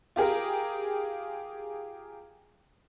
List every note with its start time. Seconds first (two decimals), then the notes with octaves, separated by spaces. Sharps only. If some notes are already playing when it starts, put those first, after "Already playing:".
0.16 F4 G4 G#4 A#4